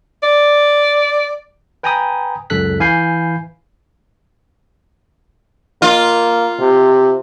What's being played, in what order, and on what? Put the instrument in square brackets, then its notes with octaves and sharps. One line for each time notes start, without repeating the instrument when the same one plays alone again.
[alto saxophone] D5
[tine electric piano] B4 G5 G#5 A#5 B5 D#6
C#2 F#2 A4 F#6 B6
E3 F5 G#5 B5 G6 C7
[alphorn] A#3 [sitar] F4
[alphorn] C3